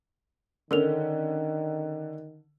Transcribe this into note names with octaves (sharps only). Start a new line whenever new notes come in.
D3 D#3 C#4 A4 A#4 F7